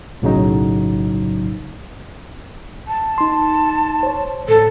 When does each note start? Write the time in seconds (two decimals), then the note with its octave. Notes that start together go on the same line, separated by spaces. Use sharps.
0.22 B1 A2 C#3 F#3 D#4
2.88 A5
3.18 D#4 C6
4.03 C5 C#5
4.48 A2 A4